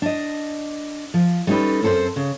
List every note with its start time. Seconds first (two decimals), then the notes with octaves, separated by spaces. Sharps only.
0.02 D4 D#5
1.14 F3
1.47 G3 C#4 D#4 G#4 A4 B4
1.82 F#2 C4 A4 A#4 C5
2.16 C#3